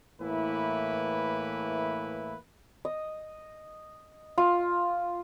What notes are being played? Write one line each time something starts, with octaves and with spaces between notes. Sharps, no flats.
A2 E3 A#3 E4 B4
D#5
F4